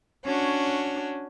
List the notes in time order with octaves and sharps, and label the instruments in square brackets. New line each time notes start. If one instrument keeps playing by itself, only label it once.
[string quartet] C#4 D4 F#4 C#5